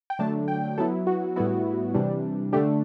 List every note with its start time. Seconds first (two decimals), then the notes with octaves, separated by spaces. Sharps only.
0.10 G5
0.19 D3 F#3 A3 D4 A5
0.48 G5
0.78 F#3 B3 E4 A4
1.07 F#4
1.36 A2 G3 B3 E4 F#4
1.94 C3 E3 G3 D4
2.53 D3 A3 D4 G4